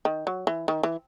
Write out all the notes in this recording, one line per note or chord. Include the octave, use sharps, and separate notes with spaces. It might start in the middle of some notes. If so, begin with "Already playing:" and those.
D#3
F#3
E3
D#3
E3